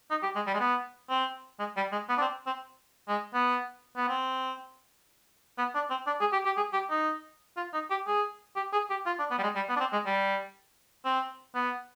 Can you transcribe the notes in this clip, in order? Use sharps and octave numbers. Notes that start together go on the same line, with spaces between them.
D#4
G4
G#3
G3
G#3
B3
C4
G#3
G3
G#3
B3
D4
C4
C4
G#3
B3
B3
C4
B3
D4
C4
D4
G#4
G4
G4
G#4
G4
D#4
F4
D#4
G4
G#4
G4
G#4
G4
F4
D4
B3
G3
G#3
G3
B3
D4
C4
G#3
G3
C4
B3